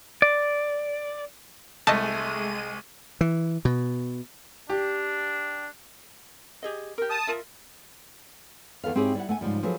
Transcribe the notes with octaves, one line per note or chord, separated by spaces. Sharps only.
D5
C2 G#3 A3 D#5 A5 D#7
E3
B2
D4 G4
G4 G#4 D#5
G4 A#4
A5 D#6
F4 A#4 E5
E2 A4 B4 F5
G#2 C4 E4 G4 G#4 C#5
G3 E4 F#5
A3 F#5 G#5
G#2 C#3 F3 G3
F3 F#3 G#4 A4 B4